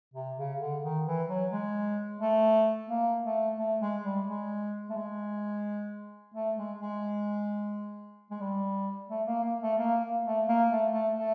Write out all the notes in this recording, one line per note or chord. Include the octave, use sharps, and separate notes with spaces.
C3
C#3
D3
D#3
E3
F#3
G#3
A3
A#3
A3
A3
G#3
G3
G#3
A3
G#3
A3
G#3
G#3
G#3
G3
A3
A#3
A#3
A3
A#3
A#3
A3
A#3
A3
A3
A3